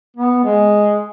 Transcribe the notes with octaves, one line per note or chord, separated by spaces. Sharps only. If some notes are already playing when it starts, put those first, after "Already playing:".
B3
G#3